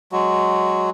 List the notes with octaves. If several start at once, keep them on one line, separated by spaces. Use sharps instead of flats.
F#3 G#3 F#4